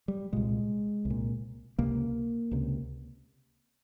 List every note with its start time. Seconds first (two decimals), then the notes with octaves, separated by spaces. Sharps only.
0.08 G3
0.33 C2 A#2 G#3
1.05 C2
1.10 A#2
1.79 C#2 C3 A#3
2.51 C#2 C3